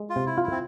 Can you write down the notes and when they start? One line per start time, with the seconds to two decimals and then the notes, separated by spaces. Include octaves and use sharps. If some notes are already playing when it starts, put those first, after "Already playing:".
Already playing: G#3
0.10 F4
0.16 C3
0.26 E4
0.38 F4
0.43 E4
0.52 C4